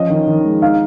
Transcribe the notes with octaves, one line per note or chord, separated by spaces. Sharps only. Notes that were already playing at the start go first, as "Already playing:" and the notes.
Already playing: F3 C#4 D#5
D#3
D#3
G#3
D#4 F5